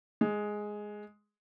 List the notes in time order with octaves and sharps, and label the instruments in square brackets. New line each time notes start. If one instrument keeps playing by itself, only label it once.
[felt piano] G#3